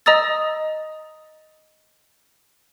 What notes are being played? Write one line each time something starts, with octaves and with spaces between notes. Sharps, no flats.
D#5 A#5 D#6 E6 A6